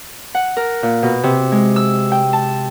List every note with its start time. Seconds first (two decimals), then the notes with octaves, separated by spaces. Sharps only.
0.35 F#5
0.57 A#4
0.83 A#2
1.03 B2
1.24 C3
1.52 G#3
1.76 E6
2.12 G5
2.33 A5